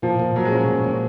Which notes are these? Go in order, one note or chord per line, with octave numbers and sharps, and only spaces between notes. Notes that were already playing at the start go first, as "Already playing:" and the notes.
A#2 F3
A#2
A#2 F#3
G#3
F#3 C#4
A#2
A#2